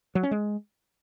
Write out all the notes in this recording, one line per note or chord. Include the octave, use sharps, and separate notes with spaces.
F#3
C#4
G#3